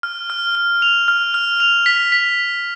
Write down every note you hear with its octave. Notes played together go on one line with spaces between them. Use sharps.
F6
F6
F6
F7
F6
F6
F7
B6
B6